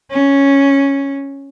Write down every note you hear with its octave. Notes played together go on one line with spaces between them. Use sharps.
C#4